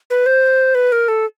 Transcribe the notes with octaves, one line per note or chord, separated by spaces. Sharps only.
B4
C5
B4
A#4
A4